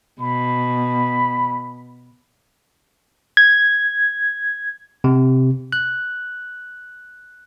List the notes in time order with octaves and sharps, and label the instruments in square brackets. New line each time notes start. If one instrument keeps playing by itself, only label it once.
[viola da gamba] B2 [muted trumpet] B5
[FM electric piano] G#6
[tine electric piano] C3
F#6